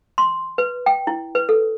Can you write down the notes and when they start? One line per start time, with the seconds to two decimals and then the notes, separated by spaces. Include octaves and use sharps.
0.18 C6
0.58 B4
0.86 G5
1.07 E4
1.35 B4
1.49 A4